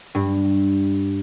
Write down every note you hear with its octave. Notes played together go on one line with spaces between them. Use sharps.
G2